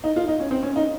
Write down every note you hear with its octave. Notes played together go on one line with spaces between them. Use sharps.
D#4
F4
D#4
C#4
C4
C#4
D#4